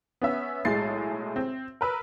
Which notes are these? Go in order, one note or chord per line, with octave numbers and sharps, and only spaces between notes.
B3 C#4 E5
B1 A2 G#3 A6 C7
C4
A#4 B4 E6